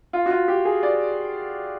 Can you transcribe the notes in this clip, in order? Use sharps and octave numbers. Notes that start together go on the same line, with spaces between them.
F4
F#4
F4
G4
G#4
D5